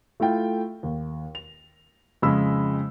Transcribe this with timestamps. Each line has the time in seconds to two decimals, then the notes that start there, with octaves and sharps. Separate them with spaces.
0.20 A3 E4 F4 G5
0.83 D#2
1.35 F7
2.22 F2 C#3 G#3 B5 E6